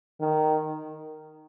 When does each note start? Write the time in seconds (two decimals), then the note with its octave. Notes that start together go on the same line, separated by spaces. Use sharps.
0.20 D#3